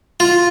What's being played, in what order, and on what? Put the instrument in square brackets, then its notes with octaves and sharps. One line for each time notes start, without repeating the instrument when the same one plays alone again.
[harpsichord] F4